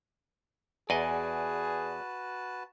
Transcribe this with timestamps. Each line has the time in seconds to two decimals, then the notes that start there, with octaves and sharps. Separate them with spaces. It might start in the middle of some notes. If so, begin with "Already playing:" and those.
0.90 E2 F#4 G#4 B4 D5 D#5 G#5 A5